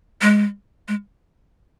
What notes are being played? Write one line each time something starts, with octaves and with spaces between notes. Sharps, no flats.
G#3
G#3